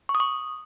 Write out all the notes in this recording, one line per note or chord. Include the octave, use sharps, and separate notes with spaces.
C#6
D#6
C#6